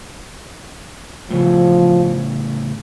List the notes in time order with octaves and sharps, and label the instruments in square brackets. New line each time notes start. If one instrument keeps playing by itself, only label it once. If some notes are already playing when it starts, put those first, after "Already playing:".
[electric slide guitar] A2 C#3 [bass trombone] F3